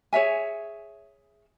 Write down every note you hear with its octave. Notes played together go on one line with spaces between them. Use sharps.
G#4 C#5 E5 G#5